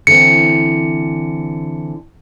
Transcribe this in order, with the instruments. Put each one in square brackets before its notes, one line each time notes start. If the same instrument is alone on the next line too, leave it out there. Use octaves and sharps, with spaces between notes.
[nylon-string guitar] D3 E3 C4 [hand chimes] C#7